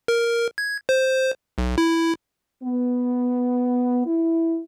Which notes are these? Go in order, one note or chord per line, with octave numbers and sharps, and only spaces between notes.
A#4
G#6
C5
B1
E4
B3
E4